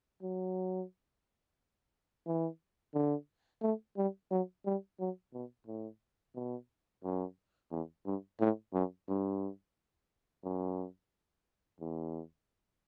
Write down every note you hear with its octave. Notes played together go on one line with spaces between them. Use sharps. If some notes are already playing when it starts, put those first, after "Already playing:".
F#3
E3
D3
A3
G3
F#3
G3
F#3
B2
A2
B2
F#2
E2
G2
A2
F#2
G2
F#2
E2